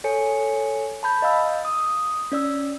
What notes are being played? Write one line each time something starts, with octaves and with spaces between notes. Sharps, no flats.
A4 C#5 G#5 C#7
A5 B5 G6
D#5 F5 E6
D#6
C#4 D5 E6